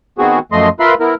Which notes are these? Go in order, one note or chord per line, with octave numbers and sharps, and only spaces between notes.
D#3 B3 C4 F#4 G#4
F#2 F3 A3 D#5 C6
F4 A#4 B4 E5 B5 C6
B3 E4 A#4